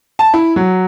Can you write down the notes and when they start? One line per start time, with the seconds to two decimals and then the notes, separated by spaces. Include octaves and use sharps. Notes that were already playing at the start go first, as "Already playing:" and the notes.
0.19 A5
0.34 E4
0.56 F#3